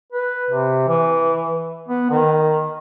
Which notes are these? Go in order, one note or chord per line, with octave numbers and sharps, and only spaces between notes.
B4
C3
E3
B3
D#3